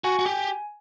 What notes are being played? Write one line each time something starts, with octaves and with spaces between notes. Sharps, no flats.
F#4 G#5
F#4
G4